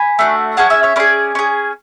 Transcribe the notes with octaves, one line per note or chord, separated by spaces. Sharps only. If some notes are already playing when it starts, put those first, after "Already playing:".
Already playing: G#5 B5
A3 D4 F#4
C#4 G#4 F#5 A5
E5 G#5
C#5 E5
C#4 G#4 B4 D5
C#4 G#4